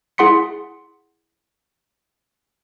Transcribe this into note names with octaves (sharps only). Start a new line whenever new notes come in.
E4 G#4 F#5 C6 B6 C#7